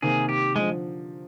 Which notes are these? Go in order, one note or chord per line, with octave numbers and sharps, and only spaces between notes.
C3 D#3 A#3 G#4
G4
D3 F3 G#3